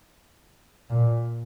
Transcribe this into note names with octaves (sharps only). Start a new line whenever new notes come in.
A#2